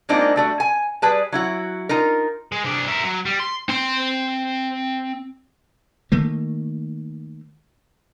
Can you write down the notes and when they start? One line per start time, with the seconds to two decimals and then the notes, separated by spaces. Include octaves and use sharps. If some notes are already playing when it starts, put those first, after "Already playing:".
0.09 G#3 A#3 C4 D4 D#4 F4
0.36 G3 A3 F#4
0.60 G#5
1.02 G3 G#4 B4 A5
1.32 F#3 E4 F#4
1.89 D#4 F4 A#4
2.52 G#3
2.64 C3 D4
2.88 A#4 E5
3.03 F#3
3.25 G3
3.40 C6
3.69 C4 C6
6.12 D#3 A3 A#3